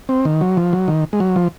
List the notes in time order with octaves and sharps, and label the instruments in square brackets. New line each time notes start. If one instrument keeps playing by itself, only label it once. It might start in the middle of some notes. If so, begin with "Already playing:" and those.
[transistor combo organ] C4
D#3
F#3
F3
F#3
D#3
G#3
F#3
F3